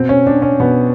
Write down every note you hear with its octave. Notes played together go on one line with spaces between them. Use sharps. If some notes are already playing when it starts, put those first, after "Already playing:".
Already playing: B2 C4
C#4
D4
C#4
B2 B3